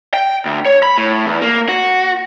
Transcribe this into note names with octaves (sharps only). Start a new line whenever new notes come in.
G5
D2
C#5
B5
A2
E2
A#3
F#4